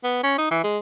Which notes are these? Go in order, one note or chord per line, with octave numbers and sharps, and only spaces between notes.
B3
C#4
D#4
E3
G#3